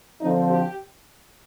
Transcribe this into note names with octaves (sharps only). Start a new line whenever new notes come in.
D3 F3 C4 D#4
G4